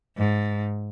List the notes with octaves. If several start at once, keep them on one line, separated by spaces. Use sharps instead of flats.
G#2